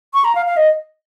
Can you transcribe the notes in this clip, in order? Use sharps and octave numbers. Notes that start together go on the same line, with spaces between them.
C#6
A#5
F5
F5
D#5